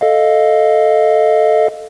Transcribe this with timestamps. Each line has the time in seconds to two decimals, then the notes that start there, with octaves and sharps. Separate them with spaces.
0.01 A4 D#5 F5